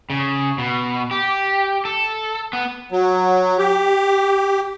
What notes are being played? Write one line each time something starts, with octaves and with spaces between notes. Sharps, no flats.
C#3
B2
G4
A4
B3
F#3
G4